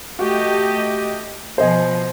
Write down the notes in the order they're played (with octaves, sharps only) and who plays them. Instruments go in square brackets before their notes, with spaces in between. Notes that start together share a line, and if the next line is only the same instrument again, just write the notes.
[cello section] A3 G4 D#5 [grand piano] F#4
[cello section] B2 F3 [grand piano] C5 D#5 G#5